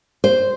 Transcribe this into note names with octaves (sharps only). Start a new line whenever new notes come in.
C5